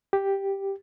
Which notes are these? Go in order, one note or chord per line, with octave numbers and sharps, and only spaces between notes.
G4